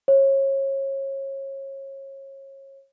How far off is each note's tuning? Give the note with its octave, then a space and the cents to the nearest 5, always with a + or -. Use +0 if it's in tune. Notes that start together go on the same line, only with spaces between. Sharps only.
C#5 -30